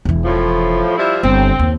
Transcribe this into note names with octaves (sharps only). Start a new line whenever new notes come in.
E1 E3
A2 F3
F3 G3 E4
G1 C4
D#2